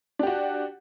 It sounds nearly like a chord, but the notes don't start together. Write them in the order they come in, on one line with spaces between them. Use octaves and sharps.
D4 G4 F#4